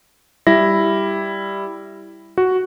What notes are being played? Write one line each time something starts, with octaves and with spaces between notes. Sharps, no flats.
G3 E4 A#6
F#4